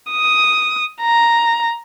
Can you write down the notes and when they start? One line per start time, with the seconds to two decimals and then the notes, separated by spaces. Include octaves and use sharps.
0.11 D#6
1.02 A#5